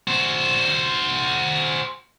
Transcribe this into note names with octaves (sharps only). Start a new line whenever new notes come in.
F#4 C5